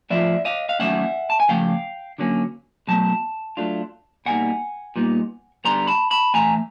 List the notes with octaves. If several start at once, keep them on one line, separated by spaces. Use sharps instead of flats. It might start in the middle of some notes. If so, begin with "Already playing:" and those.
A2 F3 A3 C4 F4 D5 E5
D#5 F5
F5
D#3 F#3 A3 C#4 E5 F#5
A5
G#5
C#3 F3 A3 F5 G5
D3 F#3 A#3 C#4
B2 F#3 A3 A5
F#3 A3 D4 F4
B2 G3 A#3 D#4 F#5 G#5
A#2 G3 B3 D#4
D3 G3 B3 A#5 C6
A5 B5
A5 B5
A2 E3 A3 G#5 A#5